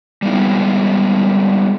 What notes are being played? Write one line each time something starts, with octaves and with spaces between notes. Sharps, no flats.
G3 G#3 B3 D#4 E4